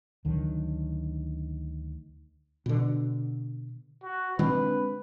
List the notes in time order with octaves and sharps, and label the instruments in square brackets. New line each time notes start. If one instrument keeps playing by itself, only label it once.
[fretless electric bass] D2 D3 D#3 F#3
B2 D3
[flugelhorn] F#4
[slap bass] D3 G#3 C4 [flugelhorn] B4